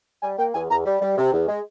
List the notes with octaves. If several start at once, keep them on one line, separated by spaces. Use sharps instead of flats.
G3 G#5
A#3 G5
E2 G#5
E2 A#5
G3
G3
C3
E2
G#3